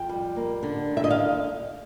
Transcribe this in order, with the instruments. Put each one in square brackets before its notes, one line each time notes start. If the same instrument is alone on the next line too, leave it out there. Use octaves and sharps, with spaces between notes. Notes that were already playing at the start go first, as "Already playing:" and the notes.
Already playing: [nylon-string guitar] F2 G5
G3
A#3
D3
D#2
E5
D#5
F5